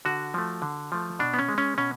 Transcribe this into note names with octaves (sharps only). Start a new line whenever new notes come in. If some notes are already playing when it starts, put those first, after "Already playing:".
D3 F#4
F3 A3
D3
F3 A3
B2 D4
B3
C#4
G#3
C#4
B2 C#4